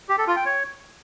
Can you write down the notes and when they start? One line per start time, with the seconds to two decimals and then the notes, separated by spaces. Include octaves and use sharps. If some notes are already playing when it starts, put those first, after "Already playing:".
0.09 G4
0.18 A4
0.27 F4
0.36 G5
0.46 C#5